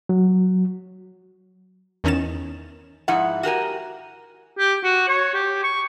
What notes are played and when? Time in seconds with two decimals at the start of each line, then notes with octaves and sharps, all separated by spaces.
0.09 F#3
2.04 E2 D#3 C#4 D#5 A6 E7
3.08 G#2 F3 E4 F#5
3.43 F#4 G4 A#4 G#5
4.59 G4
4.84 F#4
5.08 C#5
5.34 G4
5.63 C#6